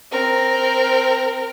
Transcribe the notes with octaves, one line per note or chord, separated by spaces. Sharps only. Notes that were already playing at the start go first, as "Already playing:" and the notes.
C4 A#4